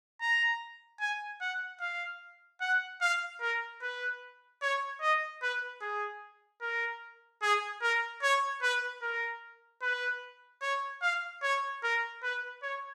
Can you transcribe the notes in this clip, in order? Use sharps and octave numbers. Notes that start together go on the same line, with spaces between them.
A#5
G#5
F#5
F5
F#5
F5
A#4
B4
C#5
D#5
B4
G#4
A#4
G#4
A#4
C#5
B4
A#4
B4
C#5
F5
C#5
A#4
B4
C#5